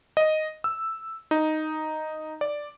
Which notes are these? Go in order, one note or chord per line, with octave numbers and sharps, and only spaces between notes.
D#5
E6
D#4
D5